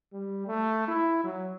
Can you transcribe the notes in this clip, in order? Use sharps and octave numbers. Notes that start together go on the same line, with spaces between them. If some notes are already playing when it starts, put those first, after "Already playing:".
G3
A3
E4
F#3